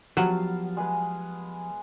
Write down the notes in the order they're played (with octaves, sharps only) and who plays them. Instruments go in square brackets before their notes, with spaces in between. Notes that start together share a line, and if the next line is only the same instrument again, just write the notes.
[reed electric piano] F3 G4 [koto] F#3 [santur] B3 F5 A5
[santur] G#3 G#4 B4